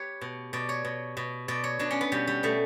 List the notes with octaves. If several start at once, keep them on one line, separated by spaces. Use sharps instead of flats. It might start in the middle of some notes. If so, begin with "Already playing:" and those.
Already playing: G4 B4 C#5
B2
B2 D5
C#5
B2
B2
B2 D5
C#5
B2 D4
C#4
B3
B2 G3
G3
B2 A3